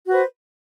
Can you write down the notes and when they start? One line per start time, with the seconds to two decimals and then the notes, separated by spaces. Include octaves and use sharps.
0.07 F#4
0.09 B4
0.12 C5